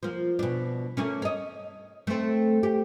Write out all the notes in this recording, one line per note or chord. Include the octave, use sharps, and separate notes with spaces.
F3 A#3
B2 D4
A3 A#3 C#4
C#5 D#5
A3 C4
G4